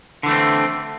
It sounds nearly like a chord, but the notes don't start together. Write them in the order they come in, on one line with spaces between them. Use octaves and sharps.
D3 E3 A3 C4